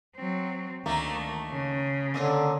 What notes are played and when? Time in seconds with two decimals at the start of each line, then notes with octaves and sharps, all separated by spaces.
0.16 F#3 C4
0.86 D2 D#3 A3 A#3 D#4
1.51 C#3
2.14 A#2 D3 C#4 D#5